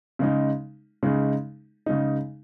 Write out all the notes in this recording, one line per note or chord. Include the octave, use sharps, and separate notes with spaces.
C#3 G#3 D#4
C#3 G#3 D#4
C#3 G#3 D#4